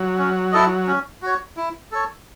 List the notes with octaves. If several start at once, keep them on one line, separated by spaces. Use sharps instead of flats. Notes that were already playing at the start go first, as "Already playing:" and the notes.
Already playing: F#3
C#4
E4 A4 D#5
C#4
F#4 C#5
E4
A4 C#5